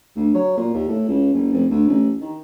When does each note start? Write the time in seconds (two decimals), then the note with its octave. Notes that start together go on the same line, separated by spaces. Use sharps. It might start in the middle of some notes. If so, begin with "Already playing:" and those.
0.16 D2
0.34 F#3
0.57 A#2
0.74 D#2
0.89 A2
1.08 C#2
1.33 F#1
1.52 F1
1.70 D2
1.88 A1
2.21 D#3